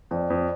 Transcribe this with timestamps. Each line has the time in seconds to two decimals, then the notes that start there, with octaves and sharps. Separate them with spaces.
0.11 F2 D5
0.30 F2